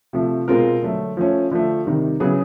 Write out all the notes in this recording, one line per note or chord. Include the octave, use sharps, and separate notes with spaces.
C3 F3 A3
B2 G#3 C4 F4 A#4
D3 F#3 A3
F3 A3 C#4
D3 F3 A3
C3 D#3 G3
C#3 F#3 B3 E4 G#4